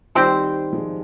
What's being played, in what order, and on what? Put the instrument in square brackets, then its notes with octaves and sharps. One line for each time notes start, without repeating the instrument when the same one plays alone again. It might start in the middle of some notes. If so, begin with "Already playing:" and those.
[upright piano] D#3 G3 [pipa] C4 G4 C5
[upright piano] F3 G#3